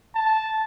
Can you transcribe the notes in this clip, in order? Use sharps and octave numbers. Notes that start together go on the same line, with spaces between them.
A5